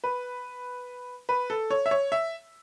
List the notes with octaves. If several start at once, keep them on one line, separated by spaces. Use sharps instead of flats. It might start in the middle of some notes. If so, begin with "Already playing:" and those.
B4
B4
A4
C#5
E5
C#5
E5